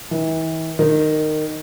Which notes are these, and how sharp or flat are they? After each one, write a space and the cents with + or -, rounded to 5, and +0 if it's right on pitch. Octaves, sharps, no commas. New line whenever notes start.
E3 -40
D#3 -15